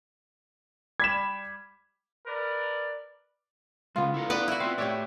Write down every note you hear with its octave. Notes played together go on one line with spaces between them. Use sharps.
G3 B5 G#6 B6 E7
A#4 B4 D5
C#3 G#3 B3 F4
E4 A4 A#4
B3 B4 D5 D#5
E4 F#4
C4 F4 E5 F5
A2 G4 C#5 D5 E5